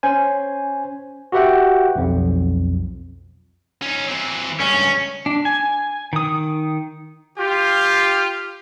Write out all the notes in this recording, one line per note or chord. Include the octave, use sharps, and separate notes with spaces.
C#4 C5 G#5
F#4 G4 B4 E5 F#5 G5
B1 F2
C#4 D#4
E3 C4
C#2 G2 C#4
D4
G#5
D#3 D#6
F4 G4